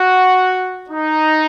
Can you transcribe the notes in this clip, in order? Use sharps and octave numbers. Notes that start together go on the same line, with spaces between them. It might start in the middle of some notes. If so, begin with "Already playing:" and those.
Already playing: F#4
D#4